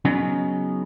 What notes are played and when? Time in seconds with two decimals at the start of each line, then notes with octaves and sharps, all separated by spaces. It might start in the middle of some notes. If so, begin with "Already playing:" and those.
0.05 C#3 F#3 B3 C#4 D#4